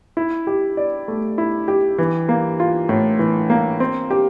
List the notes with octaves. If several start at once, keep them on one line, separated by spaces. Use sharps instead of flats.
E4
G4
D5
A3
E4
G4
E3
A#3
F4
A2
E3
A#3
C4
G4